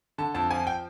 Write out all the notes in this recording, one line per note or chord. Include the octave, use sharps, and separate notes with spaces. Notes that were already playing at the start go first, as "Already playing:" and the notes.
D3 A5
F2 A5
F3 G#5
G5